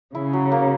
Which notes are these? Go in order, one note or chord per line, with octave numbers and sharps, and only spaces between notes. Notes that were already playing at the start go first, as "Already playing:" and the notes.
C#3 E4
F#3
A#3